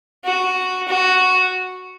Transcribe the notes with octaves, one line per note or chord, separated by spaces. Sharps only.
F#4
F#4